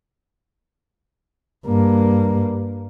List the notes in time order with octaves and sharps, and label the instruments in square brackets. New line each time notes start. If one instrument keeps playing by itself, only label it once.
[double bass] G2 A#3